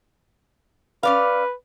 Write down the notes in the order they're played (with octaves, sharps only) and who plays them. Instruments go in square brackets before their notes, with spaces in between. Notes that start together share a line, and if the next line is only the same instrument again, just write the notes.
[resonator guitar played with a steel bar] C#4 D5 F5 [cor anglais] B4